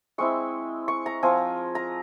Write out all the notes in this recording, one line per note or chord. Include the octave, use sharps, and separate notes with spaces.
G#3 C4 E4 C#6
C#6
A#5
F3 C4 F4 G#5
A#5